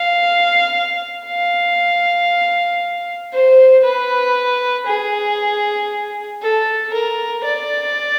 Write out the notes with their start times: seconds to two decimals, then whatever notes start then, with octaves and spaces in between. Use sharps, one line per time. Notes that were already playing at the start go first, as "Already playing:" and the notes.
Already playing: F5
1.26 F5
3.33 C5
3.84 B4
4.87 G#4
6.42 A4
6.93 A#4
7.45 D5